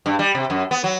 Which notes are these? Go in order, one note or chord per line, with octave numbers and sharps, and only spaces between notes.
G2
G3
C3
F#2
B3
F#3